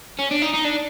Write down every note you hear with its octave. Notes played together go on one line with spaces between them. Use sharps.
C#4
D4
D#4
D#4
D4